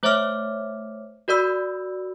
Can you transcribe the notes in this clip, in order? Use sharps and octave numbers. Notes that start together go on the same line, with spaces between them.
A3 C5 C#5 E5 D6 F6
F#4 A#4 D5 B5 E6